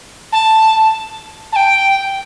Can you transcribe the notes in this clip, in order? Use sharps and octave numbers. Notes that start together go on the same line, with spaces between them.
A5
A5
G5